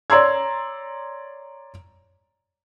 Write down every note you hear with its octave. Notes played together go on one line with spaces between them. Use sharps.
C#5 D5 A#5 C6 E6 G#6